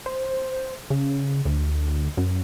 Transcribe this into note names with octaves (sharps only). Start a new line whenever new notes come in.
C5
C#3
D2
F#2